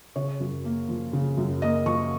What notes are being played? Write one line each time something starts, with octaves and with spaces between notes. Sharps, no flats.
C#3 C#5
F#2
A#3
F3
C#3
F#2
A#3 D#5
F3 C#6